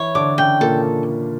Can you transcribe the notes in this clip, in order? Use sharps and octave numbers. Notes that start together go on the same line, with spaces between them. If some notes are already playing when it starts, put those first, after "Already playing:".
Already playing: E3 E4 C#5
D3 D4 D6
C#3 C#4 G5
A#2 A#3 A4